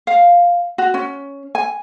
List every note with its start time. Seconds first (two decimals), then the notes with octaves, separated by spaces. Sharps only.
0.07 F5
0.78 F#4
0.94 C#4
1.55 G#5